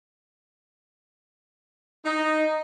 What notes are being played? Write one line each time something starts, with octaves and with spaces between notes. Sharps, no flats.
D#4